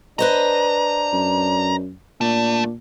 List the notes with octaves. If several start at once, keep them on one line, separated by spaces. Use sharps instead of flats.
D4 B4 C5 D#5 A#5
F#2
A#2 A3 D4